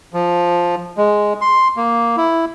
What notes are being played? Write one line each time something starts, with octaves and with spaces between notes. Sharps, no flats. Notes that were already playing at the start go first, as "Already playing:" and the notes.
F3
G#3
C6
A#3
E4